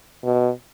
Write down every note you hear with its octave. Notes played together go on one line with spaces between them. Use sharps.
B2